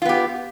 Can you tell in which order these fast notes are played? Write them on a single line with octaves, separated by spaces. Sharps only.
F4 B3 G4